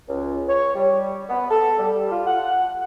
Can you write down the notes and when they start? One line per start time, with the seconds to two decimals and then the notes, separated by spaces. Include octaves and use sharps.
0.09 C#2
0.49 C#5
0.75 G3
1.29 B3
1.50 A4
1.79 G3
2.11 F4
2.27 F#5